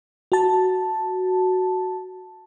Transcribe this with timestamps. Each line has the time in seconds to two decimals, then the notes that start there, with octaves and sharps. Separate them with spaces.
0.32 F#4 A5